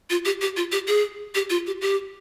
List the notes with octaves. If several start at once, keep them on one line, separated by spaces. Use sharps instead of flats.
F4
G4
G4
F4
G4
G#4
G4
F4
G4
G4